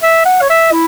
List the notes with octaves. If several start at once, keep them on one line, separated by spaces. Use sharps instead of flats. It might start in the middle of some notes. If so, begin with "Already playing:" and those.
E5
F#5
C#5
E5
E4